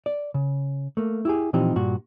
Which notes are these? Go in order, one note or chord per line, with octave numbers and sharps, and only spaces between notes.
D5
C#3
A3 A#3
E4 G4 G#4
A#2 E3 F3 C4 D#4 G4
G2 A#2 F#4